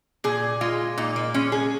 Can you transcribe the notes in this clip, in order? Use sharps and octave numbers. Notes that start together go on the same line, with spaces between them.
A#2 G#4
G#3 F4
A#2 D#4
A#3
G#3 C#4
G#4